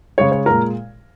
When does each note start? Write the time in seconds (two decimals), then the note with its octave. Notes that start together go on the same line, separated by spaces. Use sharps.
0.18 C#3 G#3 C#5
0.32 C#5
0.46 A#2 G#3 A#4